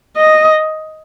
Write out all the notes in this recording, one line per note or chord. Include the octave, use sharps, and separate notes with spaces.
D#5